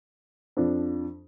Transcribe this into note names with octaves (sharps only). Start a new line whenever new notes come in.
F2 F3 D4